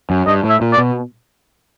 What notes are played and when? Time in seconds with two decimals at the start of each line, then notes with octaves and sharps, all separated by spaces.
0.10 F#2
0.27 G2 D#5
0.44 A2
0.49 E5
0.61 A#2
0.72 D5
0.78 B2